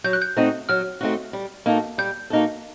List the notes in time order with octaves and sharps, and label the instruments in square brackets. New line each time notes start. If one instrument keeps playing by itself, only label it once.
[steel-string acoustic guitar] F#3 [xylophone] G6
[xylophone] F#6
G6
[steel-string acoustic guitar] A3 C4 D#4 F#4
[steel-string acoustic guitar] F#3 [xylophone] F6
[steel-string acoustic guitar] A3 C4 D#4 F#4
G3
A#3 D#4 F#4 A4
[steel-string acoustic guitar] G3 [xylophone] G6
[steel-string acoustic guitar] A#3 D#4 F#4 A4